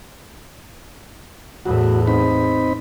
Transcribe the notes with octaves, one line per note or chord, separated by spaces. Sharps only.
E2 A2 F#4
C4 D#4 B5